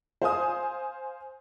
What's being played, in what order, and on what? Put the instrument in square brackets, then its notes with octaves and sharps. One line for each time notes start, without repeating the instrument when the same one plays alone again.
[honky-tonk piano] C5 F5 G#5 D#6